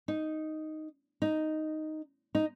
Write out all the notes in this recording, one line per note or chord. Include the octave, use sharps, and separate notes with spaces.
D#4
D#4
D#4